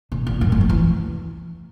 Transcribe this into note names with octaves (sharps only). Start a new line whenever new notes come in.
B2
A#2
F#2
G3
F#3
E3